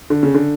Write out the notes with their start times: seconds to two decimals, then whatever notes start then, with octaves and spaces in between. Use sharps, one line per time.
0.10 D3
0.23 C#3
0.34 D3